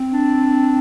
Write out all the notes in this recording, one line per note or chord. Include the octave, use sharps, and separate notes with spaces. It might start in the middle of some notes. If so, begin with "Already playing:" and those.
Already playing: C4
D4